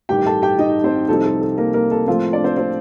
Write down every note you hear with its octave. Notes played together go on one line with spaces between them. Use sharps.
A1 G2 D#3 G4 G5
A4 A5
G4 G5
D#4 D#5
C4 C5
C2 C3 F3 C4 D#4 A4
A4
A4
A#3 A#4
A#3 A#4
A4
A2 F3 A3 C4 F4 F5
D4 D5
C4 C5
C4 C5